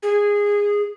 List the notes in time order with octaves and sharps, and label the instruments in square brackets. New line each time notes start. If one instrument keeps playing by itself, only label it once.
[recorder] G#4